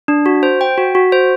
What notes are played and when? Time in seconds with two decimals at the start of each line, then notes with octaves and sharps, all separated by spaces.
0.08 D4
0.26 F#4
0.43 C5
0.61 G5
0.78 F#4
0.95 F#4
1.12 C5